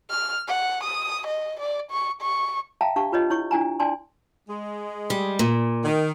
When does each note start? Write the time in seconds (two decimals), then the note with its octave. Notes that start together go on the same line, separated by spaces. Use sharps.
0.10 F6
0.48 F#5
0.84 D#6
1.27 D#5
1.60 D5
1.91 C#6
2.22 C#6
2.81 E5 F5 G5 A5 A#5
2.96 D4 G4 F5 A5 C#6
3.12 F4 B4 C#5 D#5
3.30 E4 C#5 C#6
3.51 D4 E4 G#5 A#5
3.80 D4 D5 G#5 A5 C6
4.48 G#3
5.10 G3
5.39 A#2
5.84 D#3